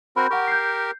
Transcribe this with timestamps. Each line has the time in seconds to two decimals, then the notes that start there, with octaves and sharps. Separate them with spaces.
0.16 C4 F#4 A#4 B5 G6
0.31 G4 A#4 F#5 C#6
0.48 G6 C7